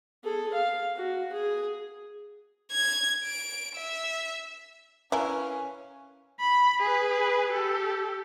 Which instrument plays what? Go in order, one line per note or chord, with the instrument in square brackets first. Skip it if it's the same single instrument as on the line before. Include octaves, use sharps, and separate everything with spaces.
[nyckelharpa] G#4 A4
F5
F#4
G#4
[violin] G#6
D7
E5
[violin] C#4 [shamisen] E4 A#4 [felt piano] B4 F5 G#5
[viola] B5
G#4 B4
G4 A4